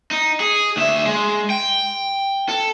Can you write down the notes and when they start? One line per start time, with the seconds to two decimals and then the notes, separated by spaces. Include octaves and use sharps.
0.11 D#4
0.40 G#4
0.77 D2 E5
1.06 G#3
1.50 G5
2.49 A4